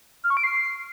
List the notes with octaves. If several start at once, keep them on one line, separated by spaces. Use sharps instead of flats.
F6
C#6
D7
C7